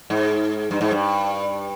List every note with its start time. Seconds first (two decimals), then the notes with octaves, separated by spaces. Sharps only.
0.10 G#2
0.71 G2
0.81 G#2
0.92 G2